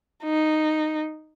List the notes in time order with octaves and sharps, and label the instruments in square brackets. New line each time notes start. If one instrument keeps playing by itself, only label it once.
[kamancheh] D#4